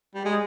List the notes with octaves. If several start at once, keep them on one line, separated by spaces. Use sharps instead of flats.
G3
G#3